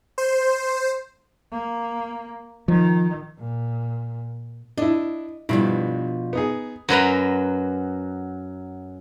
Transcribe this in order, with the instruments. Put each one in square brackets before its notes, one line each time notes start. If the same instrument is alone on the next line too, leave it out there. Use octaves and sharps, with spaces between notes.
[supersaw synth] C5
[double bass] A#3
[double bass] D#3 [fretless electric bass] F3
[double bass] A#2
[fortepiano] D4 E4 [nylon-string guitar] D#5
[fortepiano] G2 E4 [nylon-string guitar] B2 F3 D4
[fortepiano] B3 D#4 G#4
[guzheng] F#2 F#3 B4 A#5